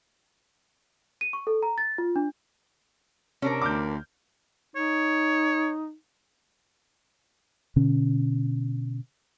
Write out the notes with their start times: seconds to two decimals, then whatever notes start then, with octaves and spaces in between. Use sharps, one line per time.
1.21 D#7
1.33 C#6
1.47 A4
1.63 A#5
1.78 A6
1.98 F4
2.16 D4
3.42 C3 C#4 D4 A#4
3.62 D2 D6 F6 G6
4.76 D#4 C#5
7.76 B2 D3 C#4